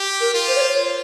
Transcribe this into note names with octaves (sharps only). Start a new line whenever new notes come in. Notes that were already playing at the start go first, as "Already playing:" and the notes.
Already playing: G4
A#4
F4
C5
C#5
C5
C#5